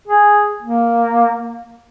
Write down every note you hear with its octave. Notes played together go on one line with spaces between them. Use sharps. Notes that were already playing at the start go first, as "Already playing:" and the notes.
G#4
A#3